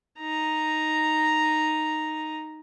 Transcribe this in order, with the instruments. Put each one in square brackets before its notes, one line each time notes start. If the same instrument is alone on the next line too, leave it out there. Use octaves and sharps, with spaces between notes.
[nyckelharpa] D#4 A#5